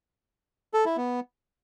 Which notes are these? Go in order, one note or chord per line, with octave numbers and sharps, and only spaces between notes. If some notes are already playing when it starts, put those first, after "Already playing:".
A4
E4
B3